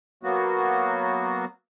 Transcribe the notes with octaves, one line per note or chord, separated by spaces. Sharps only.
F#3 A#3 B3 F#4